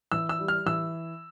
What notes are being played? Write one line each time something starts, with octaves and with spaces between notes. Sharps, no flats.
E3 E6
E6
G3
F6
E3 E6